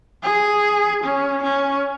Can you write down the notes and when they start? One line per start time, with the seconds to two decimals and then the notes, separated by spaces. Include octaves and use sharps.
0.23 G#4
1.04 C#4
1.44 C#4